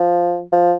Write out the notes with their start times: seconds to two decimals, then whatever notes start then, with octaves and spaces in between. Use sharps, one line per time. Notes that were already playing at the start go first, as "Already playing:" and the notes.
Already playing: F3
0.52 F3